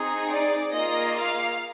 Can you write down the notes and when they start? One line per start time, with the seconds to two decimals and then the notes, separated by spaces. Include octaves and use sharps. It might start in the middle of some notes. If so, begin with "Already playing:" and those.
Already playing: C4 D#4 G#4
0.29 D5
0.72 A#3 F4 G#4 D#5
1.15 F5